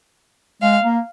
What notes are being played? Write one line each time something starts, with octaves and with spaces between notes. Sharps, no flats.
G#3 F5
A#3